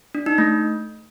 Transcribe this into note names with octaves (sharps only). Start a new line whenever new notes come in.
D4
D#4
A3